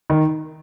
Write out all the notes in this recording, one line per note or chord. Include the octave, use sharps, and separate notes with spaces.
D#3